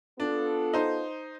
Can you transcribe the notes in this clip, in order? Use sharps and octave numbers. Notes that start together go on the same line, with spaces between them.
B3 D4 F4 A4
D#4 C5